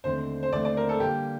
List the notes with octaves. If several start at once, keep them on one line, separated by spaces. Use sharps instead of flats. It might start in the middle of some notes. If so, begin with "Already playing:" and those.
D#2 D3 A3 C4 C5
C5
D#2 D3 A3 C4 D5
D5
A#4
A4
D3 G3 A#3 G4